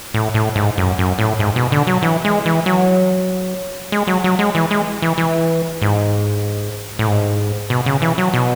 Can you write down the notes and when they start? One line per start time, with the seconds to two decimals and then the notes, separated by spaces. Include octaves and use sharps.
0.14 A2
0.34 A2
0.56 G#2
0.77 F#2
0.98 F#2
1.19 A2
1.39 G#2
1.56 B2
1.72 D3
1.87 F#3
2.02 E3
2.25 G#3
2.46 E3
2.66 F#3
3.92 G#3
4.07 F#3
4.24 F#3
4.39 G#3
4.55 E3
4.71 G#3
5.02 E3
5.18 E3
5.82 G#2
6.99 A2
7.08 G#2
7.70 B2
7.86 C#3
8.02 E3
8.18 F#3
8.34 B2